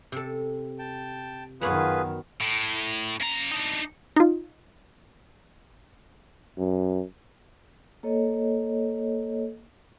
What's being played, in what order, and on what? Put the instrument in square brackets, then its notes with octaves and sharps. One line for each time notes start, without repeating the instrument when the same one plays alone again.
[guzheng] C3 A4
[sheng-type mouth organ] G5 A5
[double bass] F#2 D#3 [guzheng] F#3 B3 F#4 [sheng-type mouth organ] F4 G#4 B4
[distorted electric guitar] A2
C#3 A#5
D4 D#4
[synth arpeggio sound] D#4 F4
[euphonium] F#2
[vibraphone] A#3 A4 C#5 D#5